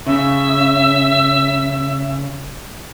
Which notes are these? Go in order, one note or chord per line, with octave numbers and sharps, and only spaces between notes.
C#3 E5